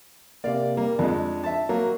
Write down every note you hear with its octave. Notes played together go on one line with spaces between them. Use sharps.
C3 A#3 D5 F5
G3 A#3
F2 G#3 D4
E5 A5
F#3 A#3